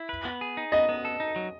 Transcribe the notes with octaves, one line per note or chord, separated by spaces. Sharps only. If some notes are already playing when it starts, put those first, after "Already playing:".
Already playing: E4
B4
B3
G#4
D#4
B3 D#5
B3
A4
D#4
F#3